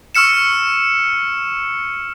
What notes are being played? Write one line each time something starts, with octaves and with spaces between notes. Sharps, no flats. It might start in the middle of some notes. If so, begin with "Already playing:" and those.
C#6 E6 F6 C#7 E7